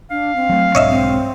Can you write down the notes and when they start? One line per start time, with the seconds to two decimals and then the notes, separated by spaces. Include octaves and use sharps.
0.10 D4 F5
0.36 C4
0.49 F#3 A3
0.75 B1 G#2 D4 C#5 D#5 E5
0.90 C4